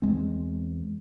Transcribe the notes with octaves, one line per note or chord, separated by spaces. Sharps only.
E2 G#3 C4